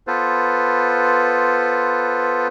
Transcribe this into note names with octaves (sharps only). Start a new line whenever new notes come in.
B3 F4 A4 B4 C5